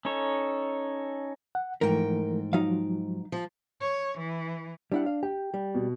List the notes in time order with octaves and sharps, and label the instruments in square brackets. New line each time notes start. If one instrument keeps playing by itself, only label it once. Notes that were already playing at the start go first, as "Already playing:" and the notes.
[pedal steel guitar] C#4 D#4 A4 C#5
[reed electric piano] F#5
[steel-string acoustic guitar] G#2 G5 [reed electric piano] E3 F3 A3 [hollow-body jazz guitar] A#4
[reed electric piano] F3 F#3 [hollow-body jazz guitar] D#4 F5
[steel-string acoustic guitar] F3
[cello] C#5
E3
[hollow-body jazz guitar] G3 E4 F#5 [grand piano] D4
[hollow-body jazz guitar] F5
[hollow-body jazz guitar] G4 [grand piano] G5
[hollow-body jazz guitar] G3
[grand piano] B2